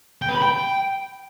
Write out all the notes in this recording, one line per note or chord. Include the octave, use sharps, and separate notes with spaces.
G5
B4
B5
G5